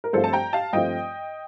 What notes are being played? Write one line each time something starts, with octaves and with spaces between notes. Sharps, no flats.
A#4
G2 F3 A3 C4 F4 A4 C5
A5
G5 A#5
F5 A5
G2 F3 A3 C4 F4 D#5 G5